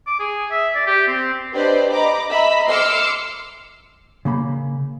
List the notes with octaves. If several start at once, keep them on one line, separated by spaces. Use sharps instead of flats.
D6
G#4
E5
D5
G4
C4
D4 G4 B4 C5 D5 D#5
D#5 A#5 B5 D6
D#5 E5 A#5 B5 E6 B6
C6 D6 E6 F6 C#7
C#3 A#3 B5